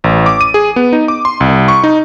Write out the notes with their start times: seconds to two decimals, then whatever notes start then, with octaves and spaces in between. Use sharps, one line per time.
0.04 A1
0.26 D6
0.41 D#7
0.54 G#4
0.76 B3
0.93 D#4
1.08 D6
1.25 C6
1.40 C2
1.68 C#6
1.84 D#4